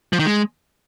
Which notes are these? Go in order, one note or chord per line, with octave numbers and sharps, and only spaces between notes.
F3
D#3
G#3